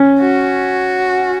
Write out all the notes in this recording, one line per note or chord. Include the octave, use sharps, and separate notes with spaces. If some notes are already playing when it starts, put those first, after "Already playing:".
Already playing: C#4
F#4